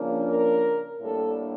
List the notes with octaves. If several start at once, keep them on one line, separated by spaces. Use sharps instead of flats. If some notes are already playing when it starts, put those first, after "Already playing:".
Already playing: C#3 F3 A#3 D4
A#4
A2 G3 A#3 D4 A4